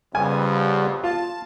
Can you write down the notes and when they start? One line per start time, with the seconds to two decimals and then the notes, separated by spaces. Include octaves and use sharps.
0.15 F2 C#3 G3 B3 G#5
1.03 F4 A5